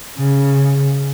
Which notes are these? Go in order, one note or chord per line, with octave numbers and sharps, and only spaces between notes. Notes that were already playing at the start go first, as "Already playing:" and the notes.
C#3